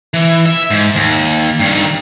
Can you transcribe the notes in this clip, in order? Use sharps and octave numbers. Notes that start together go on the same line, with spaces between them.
E3
E5
G#2
D#2
G2 D#3